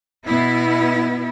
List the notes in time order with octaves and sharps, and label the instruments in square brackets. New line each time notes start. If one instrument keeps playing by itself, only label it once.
[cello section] B2 B3 E4